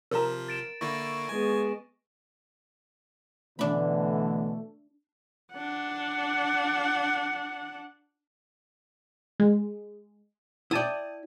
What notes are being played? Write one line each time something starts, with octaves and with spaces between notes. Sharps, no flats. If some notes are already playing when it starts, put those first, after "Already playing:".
C3 F3 F4 A#4 A#5
A6 D7 E7
D3 A#3 E4 C#6 A#6
G#3 B3 G#5
B2 D3 E3 A3 D4 B5
D4 F#5
G#3
E4 D5 G5 A5 D#6